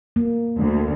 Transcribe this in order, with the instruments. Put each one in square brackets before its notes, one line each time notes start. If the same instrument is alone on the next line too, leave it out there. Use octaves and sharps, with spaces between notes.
[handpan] A#3
[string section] D2